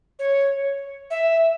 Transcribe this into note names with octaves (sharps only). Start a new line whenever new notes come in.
C#5
E5